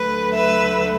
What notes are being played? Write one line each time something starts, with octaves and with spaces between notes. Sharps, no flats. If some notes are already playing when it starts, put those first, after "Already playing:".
Already playing: D2 D3 F#3 A3 B4
B4 E5